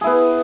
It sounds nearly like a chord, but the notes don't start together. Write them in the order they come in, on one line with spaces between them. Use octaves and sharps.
G#4 E4 B3